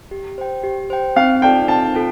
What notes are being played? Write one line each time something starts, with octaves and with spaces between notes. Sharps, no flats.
G4
C5 G5
G4
C5 G5
C4 F5
F4 A4 D5 G5 A5
C4 A5
F4 A4